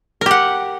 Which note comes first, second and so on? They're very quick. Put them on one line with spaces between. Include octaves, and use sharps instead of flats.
A#4 G4 F#5